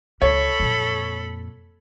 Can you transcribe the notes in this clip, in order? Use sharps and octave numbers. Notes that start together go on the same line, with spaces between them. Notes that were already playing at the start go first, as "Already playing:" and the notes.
C#2 A4 C#5 B5
F2 A#2